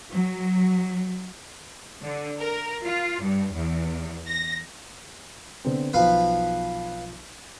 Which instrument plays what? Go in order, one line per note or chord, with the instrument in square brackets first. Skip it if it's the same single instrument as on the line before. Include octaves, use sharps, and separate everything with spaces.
[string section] F#3
D3
A#4
F4
G2
E2
A#6
[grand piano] D3 B3 C4
[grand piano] B1 F3 [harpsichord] B4 F5